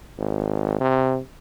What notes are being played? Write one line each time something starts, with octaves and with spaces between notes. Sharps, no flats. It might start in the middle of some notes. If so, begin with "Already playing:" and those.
G#1
C3